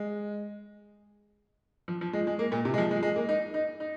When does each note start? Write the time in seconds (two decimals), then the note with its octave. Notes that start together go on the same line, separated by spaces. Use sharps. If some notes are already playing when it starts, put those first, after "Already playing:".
Already playing: G#3
1.88 F3
2.01 F3
2.13 G#3
2.27 G#3
2.39 A#3
2.52 A#2
2.65 C3
2.74 G#3
2.78 F3
2.91 G#3
3.03 G#3
3.16 A#3
3.29 D#4
3.54 D#4
3.80 D#4